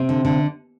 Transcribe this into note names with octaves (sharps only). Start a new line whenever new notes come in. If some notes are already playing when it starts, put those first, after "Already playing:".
Already playing: C3 C4
D3
D3